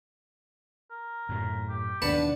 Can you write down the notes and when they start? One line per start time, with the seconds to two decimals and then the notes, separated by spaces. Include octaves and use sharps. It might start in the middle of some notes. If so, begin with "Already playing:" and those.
0.91 A#4
1.29 F#2 A2
1.70 G4
2.02 D#2 B2 D#3 D4 B4 F#5 A5